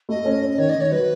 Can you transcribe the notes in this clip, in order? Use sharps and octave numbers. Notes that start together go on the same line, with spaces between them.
A3 D#5
C#4
C#4
D#3 C#5
D#3 D#5
C#5
F#3 B4